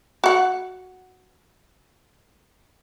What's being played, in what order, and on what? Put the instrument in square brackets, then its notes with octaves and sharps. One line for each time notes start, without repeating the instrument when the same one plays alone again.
[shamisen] F#4 F#5